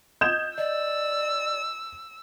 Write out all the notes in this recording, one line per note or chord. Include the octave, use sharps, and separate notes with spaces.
D#5 D#6 G6 G#6 E7
D5 D#5 E6